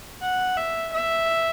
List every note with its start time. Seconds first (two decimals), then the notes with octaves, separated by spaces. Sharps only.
0.22 F#5
0.57 E5
0.92 E5